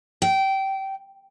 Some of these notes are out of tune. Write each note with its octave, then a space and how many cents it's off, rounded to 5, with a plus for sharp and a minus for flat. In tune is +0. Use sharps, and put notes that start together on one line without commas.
G5 -20